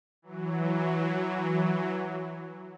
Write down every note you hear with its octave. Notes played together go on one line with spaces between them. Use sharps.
E3 F#3